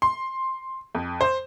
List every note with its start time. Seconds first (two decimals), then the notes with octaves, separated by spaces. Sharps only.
0.02 C6
0.95 F2
1.21 C5